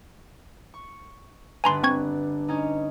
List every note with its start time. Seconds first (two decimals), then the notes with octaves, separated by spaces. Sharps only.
0.74 C#6
1.64 G1 D4 B4 G#5 A#5 C6
1.83 C4 C#6 G#6
2.48 C#4 D#4